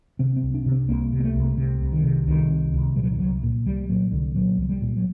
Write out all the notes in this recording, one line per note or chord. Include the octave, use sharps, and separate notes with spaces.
C3 C4
C4
C2
D4
C3
C4
C2 A#3
C3
A#3
A3
C2
C3
C2
D#3
C3
C2 D#3
C3
C2
A#2 G3
F#3
D#3
C2 F#3
A#2
C2 G3
A#2 F#3
C2 D3
A#2 F#3
C2 F#3
G3
A#2
F#3